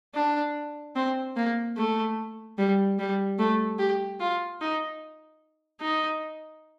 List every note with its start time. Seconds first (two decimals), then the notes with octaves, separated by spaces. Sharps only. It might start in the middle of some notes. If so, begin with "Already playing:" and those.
0.15 D4
0.96 C4
1.36 A#3
1.77 A3
2.58 G3
2.99 G3
3.39 A3
3.79 G4
4.20 F4
4.61 D#4
5.81 D#4